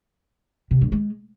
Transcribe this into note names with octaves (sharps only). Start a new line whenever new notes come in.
C3
G2
G#3